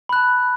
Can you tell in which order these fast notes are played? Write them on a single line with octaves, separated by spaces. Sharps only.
B5 F#6 A5